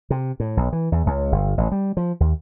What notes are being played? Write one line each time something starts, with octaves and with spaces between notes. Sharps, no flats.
C3
A2
B1
E3
E2
C#2
G1
A1
G3
F3
D#2